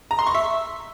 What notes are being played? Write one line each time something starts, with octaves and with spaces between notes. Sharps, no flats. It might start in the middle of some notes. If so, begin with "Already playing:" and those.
A#5
C6
C#6
E5